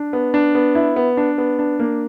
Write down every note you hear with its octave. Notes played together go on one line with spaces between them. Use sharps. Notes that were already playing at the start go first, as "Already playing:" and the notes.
Already playing: D4
B3
D4
B3
E4
B3
D4
B3
D4
A#3